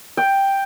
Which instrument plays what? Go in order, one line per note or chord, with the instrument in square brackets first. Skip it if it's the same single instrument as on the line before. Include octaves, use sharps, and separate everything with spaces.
[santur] G5